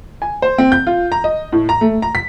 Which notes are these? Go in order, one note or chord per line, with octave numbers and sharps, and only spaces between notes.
G#5
C5
C4
G6
F4
A#5
D#5
A2
A#5
A3
A#5
B6